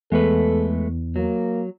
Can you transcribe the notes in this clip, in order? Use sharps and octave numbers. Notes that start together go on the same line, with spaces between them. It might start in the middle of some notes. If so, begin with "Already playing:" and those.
E2 G#3 A3 A4 B4
F#3 A#3